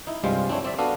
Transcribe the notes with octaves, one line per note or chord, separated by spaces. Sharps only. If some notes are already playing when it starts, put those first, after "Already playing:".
D#4 E4
C2 G2 G3 G#3 F4 C5
C4 D4 E4 C#5
C4 D5 E5
B3 D4 F#4 A4 D5 F5